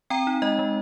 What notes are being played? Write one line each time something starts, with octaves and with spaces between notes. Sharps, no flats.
C4 G5 A#5
D#4
G#3 D#5
G#3